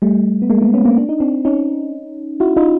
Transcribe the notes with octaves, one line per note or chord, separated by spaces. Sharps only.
G3 A3
B3
G#3 A#3
A3 B3
B3 C#4
A#3 C4
D4
D#4
C4 D4
C#4 D#4
E4 F#4
D#4 F4